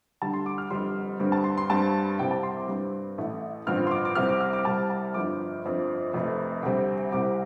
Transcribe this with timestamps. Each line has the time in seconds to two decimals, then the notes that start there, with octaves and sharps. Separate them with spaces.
0.22 D2 D3 G3 A5
0.33 C6
0.46 D6
0.58 F6
0.70 F1 F2 D3 G3 C6
1.20 G2 D3 G3 C4
1.32 A5
1.44 C6
1.57 C6
1.70 G2 G3 C4 A5
2.18 C2 C3 G3 C4 G5
2.31 A5
2.43 C6
2.56 D6
2.68 G2 G3 C4
3.18 A1 A2 A3
3.67 A1 G2 D3 F3 C4 F6
3.87 C6
3.91 D6
4.05 D6
4.15 C2 C3 G3 C4 F6
4.29 D6
4.40 F6
4.53 D6
4.65 C2 C3 G3 C4 A5
4.90 A5
5.14 G1 F2 F3 C4 D6
5.65 G1 F2 F3 C4
6.13 F1 F2 C3 A3 C4
6.63 D2 C3 G3 C4
7.12 C2 C3 G3 C4 D6